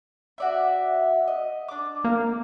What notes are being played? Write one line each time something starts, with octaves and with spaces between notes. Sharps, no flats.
F#4 D5 E5
D#5
D4 D6
A#3